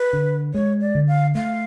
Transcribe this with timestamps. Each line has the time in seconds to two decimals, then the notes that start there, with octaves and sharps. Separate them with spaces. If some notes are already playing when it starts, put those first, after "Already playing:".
Already playing: B4
0.13 D3
0.54 G#3 C#5
0.81 D5
0.95 D3
1.08 F5
1.35 A3 F5